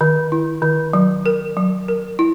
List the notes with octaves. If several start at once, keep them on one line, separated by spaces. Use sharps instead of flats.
D#3
E4
D#3
F#3
A#4
F#3
A#4
E4